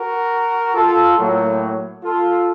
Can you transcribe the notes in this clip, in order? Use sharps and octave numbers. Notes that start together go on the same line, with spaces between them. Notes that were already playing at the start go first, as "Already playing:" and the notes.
Already playing: F#4 A#4
F4 A4
A2 F#3 A#3
F4 A4